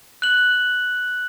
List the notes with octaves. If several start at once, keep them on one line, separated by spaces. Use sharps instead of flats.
F#6 F#7